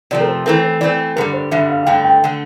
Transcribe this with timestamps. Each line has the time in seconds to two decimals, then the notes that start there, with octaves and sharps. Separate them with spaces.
0.11 C3 F3 A3 D5
0.20 A#4
0.28 C5
0.46 E3 A3 C4 A#4
0.64 C5
0.81 E3 A3 C4 D5
1.16 G2 D3 G3 A#4
1.33 C5
1.51 G2 D3 G3 E5
1.70 F5
1.83 F5
1.86 G2 D3 A3 G5
2.04 G5
2.24 D3 A3